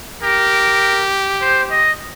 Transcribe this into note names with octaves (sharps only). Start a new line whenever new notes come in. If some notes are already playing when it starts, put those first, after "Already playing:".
G4 A#4
C5
D#5